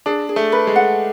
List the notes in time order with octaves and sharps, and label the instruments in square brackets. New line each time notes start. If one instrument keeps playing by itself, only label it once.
[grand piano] D4 [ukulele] G#4
[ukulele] G#4
[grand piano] A3
[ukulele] B4
[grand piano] G#3
[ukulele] F#5